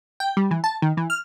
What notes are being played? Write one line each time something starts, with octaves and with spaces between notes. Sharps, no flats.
G5
G3
E3
A5
D#3
E3
F6